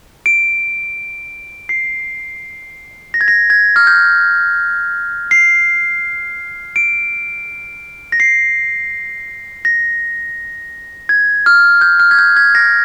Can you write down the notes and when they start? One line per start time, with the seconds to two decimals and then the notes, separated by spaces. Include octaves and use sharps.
0.26 D7
1.69 C7
3.14 A#6
3.21 G#6
3.28 A#6
3.50 G#6
3.76 F6
3.87 G6
5.31 C7
6.76 D7
8.12 A#6
8.20 C7
9.65 A#6
11.09 G#6
11.46 F6
11.81 G6
11.99 F6
12.11 G#6
12.19 G6
12.36 G#6
12.55 A#6